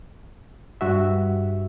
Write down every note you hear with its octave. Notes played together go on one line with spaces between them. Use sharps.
G2 F#4 E5